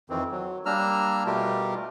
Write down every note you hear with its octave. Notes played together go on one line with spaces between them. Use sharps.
F2 D#3 E3 C4
F#3
G3 A#3 D4 A#5 E6 F6
B2 G3 A3 F4 G4 A#4